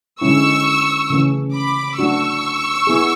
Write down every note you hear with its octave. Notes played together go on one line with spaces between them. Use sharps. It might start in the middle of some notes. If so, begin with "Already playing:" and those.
D3 G#3 C#4 E4 C#6 E6
C#3 E3 A3 C#4
B5 D6
A3 D4 F#4 C#6 E6
B3 E4 G#4